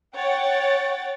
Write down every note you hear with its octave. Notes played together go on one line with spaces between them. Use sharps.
C#5 F#5 G5 A6